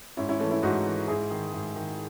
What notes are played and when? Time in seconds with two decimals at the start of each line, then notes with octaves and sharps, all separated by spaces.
0.17 G#2 C#4 E4
0.29 C#4 E4
0.40 E3 A3 C#4
0.51 C#4 E4
0.63 G#2 D#4 F#4
0.85 E3
1.08 G#2 E4 G#4
1.31 D#3
1.53 G#2
1.76 D#3